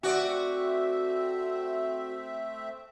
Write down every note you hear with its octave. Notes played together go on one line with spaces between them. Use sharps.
A3 C4 F#4 D5 E5